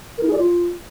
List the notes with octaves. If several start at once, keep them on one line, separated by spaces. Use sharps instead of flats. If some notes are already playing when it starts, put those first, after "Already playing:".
A#4
E4
G#4
D5
F4